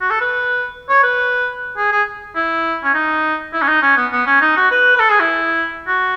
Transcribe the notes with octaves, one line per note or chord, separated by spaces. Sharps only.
F#4
A4
B4
C#5
B4
G#4
G#4
E4
C#4
D#4
E4
C#4
D#4
C#4
B3
B3
C#4
D#4
F#4
B4
B4
A4
G#4
E4
F#4